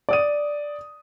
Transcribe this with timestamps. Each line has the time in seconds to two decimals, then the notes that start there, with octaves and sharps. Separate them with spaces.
0.09 D5 D#6 D#7